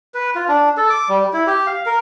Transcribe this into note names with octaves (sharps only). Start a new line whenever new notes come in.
B4
F4
D4
A4
D6
G3
E4
G4
F5
A#4